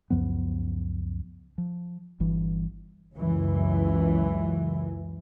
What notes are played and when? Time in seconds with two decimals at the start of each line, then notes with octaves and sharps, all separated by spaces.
0.10 C#2 F#2 F3 B3
1.58 F3
2.20 G1 G2 E3
3.16 C#2 F#2 E3